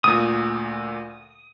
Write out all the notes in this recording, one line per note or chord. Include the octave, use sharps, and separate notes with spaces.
D2 A#2 D#6